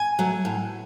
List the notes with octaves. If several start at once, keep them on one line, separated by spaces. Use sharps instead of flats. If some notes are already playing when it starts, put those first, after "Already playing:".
Already playing: G#5
F#3 A3
A2